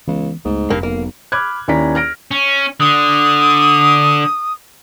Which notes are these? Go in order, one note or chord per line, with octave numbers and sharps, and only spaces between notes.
C#2 E3 B3
C#2 G#2 A3 B3
F1 G2 A#3 C#4
B1 A#3
B5 D6 F6 F#6 G#6
D#2 C#4 E4 D5 A#5 B6
F6 A#6 D7
C#4
D3 D#6